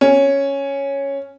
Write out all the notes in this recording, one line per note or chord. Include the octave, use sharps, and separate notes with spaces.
C#4